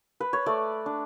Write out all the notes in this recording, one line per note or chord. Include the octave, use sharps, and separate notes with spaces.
B4
C#5
A3 D5
D4